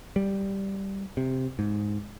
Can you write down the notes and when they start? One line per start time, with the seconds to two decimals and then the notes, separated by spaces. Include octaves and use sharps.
0.16 G3
1.17 C3
1.59 G#2